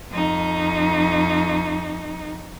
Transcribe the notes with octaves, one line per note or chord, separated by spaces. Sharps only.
F2 D#4